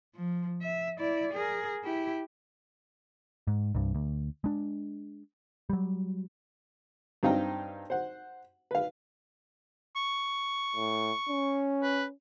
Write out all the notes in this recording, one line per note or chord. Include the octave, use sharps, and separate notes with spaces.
F3
E5
E4 D5
G#4 A#4
E4 G4
G#2
C2 G2
D2
G#3 D4
F#3 G3
G2 C4 D#4 F5 G5 A#5
C5 F#5
B4 F5
C#6
A2
C#4
B4